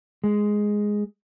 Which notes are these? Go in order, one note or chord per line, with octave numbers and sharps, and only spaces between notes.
G#3